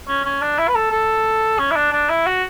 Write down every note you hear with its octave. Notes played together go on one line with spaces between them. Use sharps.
C#4
C#4
D4
E4
B4
A4
A4
C#4
E4
D4
D4
E4
F#4